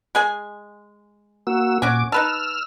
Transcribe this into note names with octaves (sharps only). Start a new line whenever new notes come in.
G#3 G#4 G#5
A#3 F#4 E6
A#2 C#4 F#4 G#5 D6
D#4 B4 A5 E6 F6